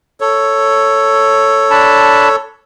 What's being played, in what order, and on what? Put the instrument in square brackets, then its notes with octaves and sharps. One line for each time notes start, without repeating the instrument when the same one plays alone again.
[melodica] A4 C#5
[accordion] D4 A5 B5